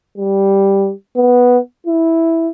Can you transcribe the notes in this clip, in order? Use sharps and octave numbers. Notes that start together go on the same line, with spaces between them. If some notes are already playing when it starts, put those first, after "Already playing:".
G3
B3
E4